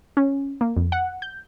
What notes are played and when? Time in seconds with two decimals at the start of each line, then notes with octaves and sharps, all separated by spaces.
0.17 C#4
0.61 A#3
0.77 F2
0.92 F#5
1.22 G6